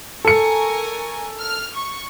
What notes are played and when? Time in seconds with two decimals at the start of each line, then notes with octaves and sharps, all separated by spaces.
0.25 A4 A#4 G#5 C#6 C#7
1.40 F6
1.76 C#6